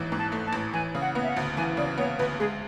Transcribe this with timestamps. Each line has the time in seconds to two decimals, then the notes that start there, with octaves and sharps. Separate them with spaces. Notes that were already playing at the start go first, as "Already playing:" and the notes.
Already playing: A1 G#2 E3
0.12 G#2
0.19 A5
0.32 A3
0.47 A5
0.53 A1
0.73 E3 G#5
0.95 C#3
1.01 F#5
1.15 B3
1.23 E5
1.30 F#5
1.37 D2
1.57 E3 G#5
1.77 C#3 D5
1.98 B3 C#5
2.18 D2 B4
2.39 G#3 G#4